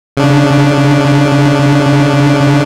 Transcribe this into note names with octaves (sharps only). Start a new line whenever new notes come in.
C#3 D4